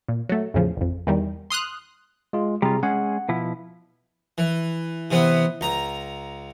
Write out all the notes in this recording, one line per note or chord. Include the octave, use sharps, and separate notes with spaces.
A#2
F#3 A3
E2 A2 C#3 F3
A1 F2
E2 D#3 G3
C6 D#6 F6 F#6
G#3 F4
C3 G3 F4 G#4 A#5
G#3 C#4 G#4 F#5
B2 F3 E4
E3
C3 E3 B3
C#2 A#5